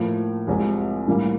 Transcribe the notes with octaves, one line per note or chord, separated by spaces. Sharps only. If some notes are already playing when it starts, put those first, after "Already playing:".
Already playing: A2 F3 A#3
C2 C3 F3 G#3
A2 E3 G3 A#3